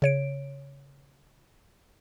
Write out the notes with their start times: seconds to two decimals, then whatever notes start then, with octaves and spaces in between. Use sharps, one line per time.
0.02 C#3 C#5 D7